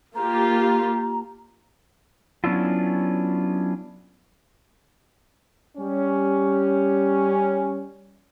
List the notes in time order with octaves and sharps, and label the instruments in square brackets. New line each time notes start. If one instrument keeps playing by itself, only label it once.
[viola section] A#3 F4 G4 [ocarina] A#5
[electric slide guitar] F#3 B3 C#4 D4 E4 F4
[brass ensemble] G3 C#4